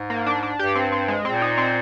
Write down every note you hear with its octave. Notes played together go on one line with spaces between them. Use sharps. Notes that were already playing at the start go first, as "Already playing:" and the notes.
Already playing: G#2
A#3
D4
D4
G2 G4
C4
C4
G#3
A#2 C4
D#4
C4